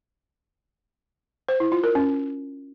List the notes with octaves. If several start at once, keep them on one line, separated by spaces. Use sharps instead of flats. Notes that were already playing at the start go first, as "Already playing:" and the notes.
C5
E4
F4
A#4
C#4